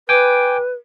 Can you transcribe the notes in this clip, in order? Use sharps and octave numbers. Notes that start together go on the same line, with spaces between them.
B4 G5 G#5 D6